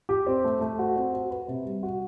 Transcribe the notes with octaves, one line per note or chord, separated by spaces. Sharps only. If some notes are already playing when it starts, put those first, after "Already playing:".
G4
C4
A3
A3
F#4
C4
F#4
B4
C3
G3
F#4